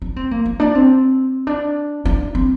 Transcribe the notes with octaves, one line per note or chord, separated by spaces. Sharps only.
D4
C4
A#3
A#3
D4
C4
D4
D4
C4